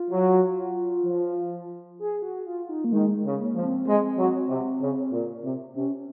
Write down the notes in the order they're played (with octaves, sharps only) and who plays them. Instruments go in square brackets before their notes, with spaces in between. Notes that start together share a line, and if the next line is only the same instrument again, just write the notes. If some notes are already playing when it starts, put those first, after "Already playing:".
Already playing: [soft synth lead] F4
[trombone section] F#3
F3
[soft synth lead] G#4
F#4
F4
D#4
A#3
[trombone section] D#3 [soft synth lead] G#3
[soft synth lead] G#3
[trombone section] C#3
[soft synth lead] A#3
[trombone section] F3
[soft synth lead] C4
[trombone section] G#3
F#3
C3
C#3
A#2
C3
[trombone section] C3 [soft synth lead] C#4